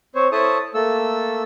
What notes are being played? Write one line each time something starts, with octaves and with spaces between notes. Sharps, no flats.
C4 C5 C#5
E4 A4 C5 C#5 A5 D#6
A3 A#3 A4 E6